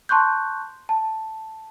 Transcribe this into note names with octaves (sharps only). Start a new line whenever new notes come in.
A5 C6 C#6 F#6 G6
A5